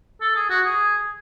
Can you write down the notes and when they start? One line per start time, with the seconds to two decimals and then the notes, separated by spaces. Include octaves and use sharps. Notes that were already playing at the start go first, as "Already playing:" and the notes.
0.21 A4
0.35 G#4
0.50 F#4
0.65 G#4